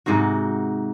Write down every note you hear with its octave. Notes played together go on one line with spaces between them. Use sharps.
G#2 C3 D#4 F#4